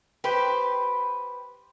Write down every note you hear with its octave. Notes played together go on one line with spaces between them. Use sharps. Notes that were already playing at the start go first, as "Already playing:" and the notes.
G4 B4 C5